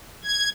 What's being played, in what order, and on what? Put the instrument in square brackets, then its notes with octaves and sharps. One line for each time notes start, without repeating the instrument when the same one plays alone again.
[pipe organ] G#6